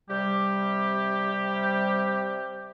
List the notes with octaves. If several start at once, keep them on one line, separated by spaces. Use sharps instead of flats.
C3 G3 G4